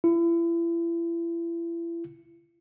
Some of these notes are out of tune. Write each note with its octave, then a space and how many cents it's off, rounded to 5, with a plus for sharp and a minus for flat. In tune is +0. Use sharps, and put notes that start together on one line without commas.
E4 +35